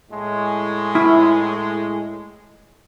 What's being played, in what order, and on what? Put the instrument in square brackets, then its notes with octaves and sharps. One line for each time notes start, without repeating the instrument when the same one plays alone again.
[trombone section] A2 G#3
[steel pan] E4